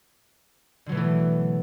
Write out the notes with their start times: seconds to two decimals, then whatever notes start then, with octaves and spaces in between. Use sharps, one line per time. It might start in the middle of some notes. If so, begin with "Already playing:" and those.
0.86 D3
0.89 F#3
0.92 B2
0.94 A3
0.97 E3